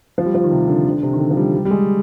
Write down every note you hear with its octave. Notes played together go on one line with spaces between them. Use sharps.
F3
G3
F3
D#3
C3
D3
D3
C3
D#3
D3
F3
G3
G3
G3
G#3